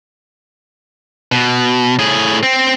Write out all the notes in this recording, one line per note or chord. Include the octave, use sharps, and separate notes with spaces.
B2
A2 G#4
C4